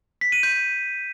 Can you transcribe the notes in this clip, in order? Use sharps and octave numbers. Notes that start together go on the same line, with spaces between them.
B6
D#7
G6